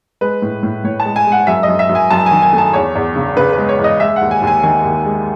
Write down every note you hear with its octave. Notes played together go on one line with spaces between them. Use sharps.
G#3 B4
A2
A2
A2 C#5
A5
G#3
G#5
G#3 F#5
F#2 E5
F#2 D#5
E5
F#2
G#5
F#2 A5
G#5
D#3
G#5
A3
A5
E2 C#5
E2
C#3
C#3 B4
B4
G#3
C#5
E2
D#5
G#3 E5
D#2 F#5
G#5
D#2
G#5
D#3 G#5
D#2
G#3